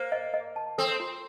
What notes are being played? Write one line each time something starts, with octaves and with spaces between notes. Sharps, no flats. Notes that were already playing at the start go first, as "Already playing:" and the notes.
Already playing: A#3 C5
D#5
D#5
A5
C4 A4
F4